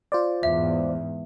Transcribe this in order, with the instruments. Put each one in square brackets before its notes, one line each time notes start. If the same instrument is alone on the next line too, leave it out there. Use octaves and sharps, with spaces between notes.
[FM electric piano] F4 C5 D5
[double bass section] E2 G#2 [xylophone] E5